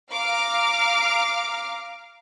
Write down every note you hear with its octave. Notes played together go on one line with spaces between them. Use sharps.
F5 A#5 D6 F6